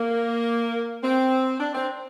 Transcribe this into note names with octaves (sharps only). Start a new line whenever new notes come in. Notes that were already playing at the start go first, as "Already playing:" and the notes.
Already playing: A#3
C4
D4
C4